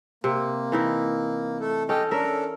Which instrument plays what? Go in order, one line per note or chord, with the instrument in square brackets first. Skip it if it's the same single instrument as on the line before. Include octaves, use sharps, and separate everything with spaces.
[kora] C3 [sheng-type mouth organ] A#3
[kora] E3 D#4 E4
[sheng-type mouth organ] A3 A4
[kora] C#4 A4 [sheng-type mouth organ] G4 D#5 G5
[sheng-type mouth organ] C#4 D4 A4 [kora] A#4 E5